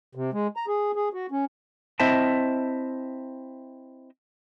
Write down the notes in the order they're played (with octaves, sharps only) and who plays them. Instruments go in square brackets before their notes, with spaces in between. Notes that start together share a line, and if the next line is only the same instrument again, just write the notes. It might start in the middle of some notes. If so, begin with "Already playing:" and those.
[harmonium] C3
G#3
A#5
G#4
G#4
F#4
C#4
[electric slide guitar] C4 E4 C5 D#5 E5 A5